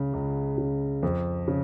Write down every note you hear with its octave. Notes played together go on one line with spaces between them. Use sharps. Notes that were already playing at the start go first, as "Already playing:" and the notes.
Already playing: C#2 C#3
C#2
C#3
F2
C#3